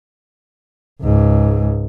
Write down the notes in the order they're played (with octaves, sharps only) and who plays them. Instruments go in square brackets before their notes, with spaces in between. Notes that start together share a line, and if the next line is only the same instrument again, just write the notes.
[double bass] C#2 G#2